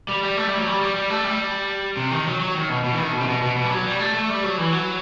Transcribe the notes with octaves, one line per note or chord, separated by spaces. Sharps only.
G3
G3
A3
G3
F#3
G3
G3
G3
A3
G3
C3
D#3
F#3
F#3
D#3
B2
B2
E3
D#3
B2
C3
B2
B2
B2
G3
F#3
G3
A3
A3
G3
F#3
E3
F#3